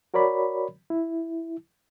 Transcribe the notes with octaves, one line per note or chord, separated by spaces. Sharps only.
F#4 A#4 C#5 D5 B5
E4